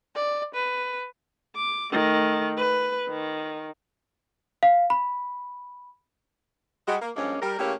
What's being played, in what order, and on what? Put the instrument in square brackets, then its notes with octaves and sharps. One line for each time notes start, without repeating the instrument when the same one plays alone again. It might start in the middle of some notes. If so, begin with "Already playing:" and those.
[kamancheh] D5
B4
[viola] D6
D#3 A3
B4
D#3
[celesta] F5
B5
[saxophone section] G3 G#3 F#4
A#3
G2 F3 G#3 A#3 C#4
G3 A#4
C#3 A3 A#3 E4 G4 C#5